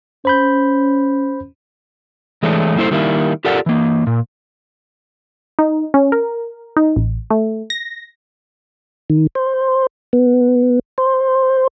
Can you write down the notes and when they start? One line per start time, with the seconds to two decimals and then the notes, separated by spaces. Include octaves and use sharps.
0.25 C#4 C5 B5 G6
2.43 E3 G#3 A3 D4 C#5
2.76 G3 A#3 E4 A4 C5
2.91 D#3 G3 A#3 E4
3.45 F4 G4 A4 A#4 D5 F#5
3.66 E3 A#3
4.07 A#2
5.59 D#4
5.94 C#4
6.12 A#4
6.77 D#4
6.96 A1
7.31 A3
7.70 A#6
9.10 D#3
9.35 C5
10.13 B3
10.98 C5